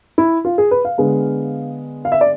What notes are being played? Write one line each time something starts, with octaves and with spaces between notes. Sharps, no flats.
E4
F4
G#4
B4
F5
D3 G#3 B3
F5
E5
D5